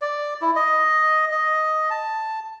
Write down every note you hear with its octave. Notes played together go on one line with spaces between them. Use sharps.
D5
E4
D#5
D#5
A5